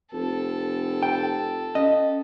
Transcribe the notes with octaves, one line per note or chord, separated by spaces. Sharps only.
F1 A4
G5
C#4 D#5 F5